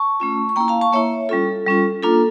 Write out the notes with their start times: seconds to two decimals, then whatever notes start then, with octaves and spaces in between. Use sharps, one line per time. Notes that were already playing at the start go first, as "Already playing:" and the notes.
Already playing: A5 C#6
0.20 A3 C#4 F4
0.49 C#6
0.56 A#3 E4 G5 A#5
0.68 F5 A5
0.81 A5 C#6
0.92 A#3 E4 C#5 E5
1.29 G3 C#4 F4 A4
1.66 G3 C#4 F4
2.03 A#3 D4 F4 A4